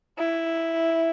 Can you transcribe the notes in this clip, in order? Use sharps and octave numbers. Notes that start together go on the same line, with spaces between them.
E4